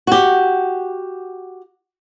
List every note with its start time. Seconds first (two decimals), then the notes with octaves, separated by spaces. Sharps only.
0.07 F#4 G4